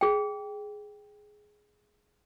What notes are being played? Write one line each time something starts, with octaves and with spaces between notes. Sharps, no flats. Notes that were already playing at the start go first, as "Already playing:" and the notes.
G#4 G5